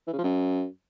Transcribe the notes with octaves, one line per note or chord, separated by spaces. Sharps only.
E3
C#3
F3
F#2